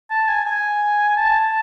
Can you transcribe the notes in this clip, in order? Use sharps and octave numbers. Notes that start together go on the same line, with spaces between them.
A5
G#5
G#5
A5